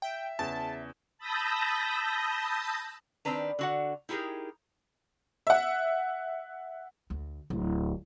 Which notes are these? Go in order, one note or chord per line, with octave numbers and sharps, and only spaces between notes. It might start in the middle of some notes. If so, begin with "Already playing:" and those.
E5 G5
E2 C#3 A5 E7
A5 B5 D#6 E6 G6 A#6
D#3 C4 D4 B4 A#5
D3 F#4 F#5
D#4 E4 G4 G#4 A#4
E5 F#5
D2
D1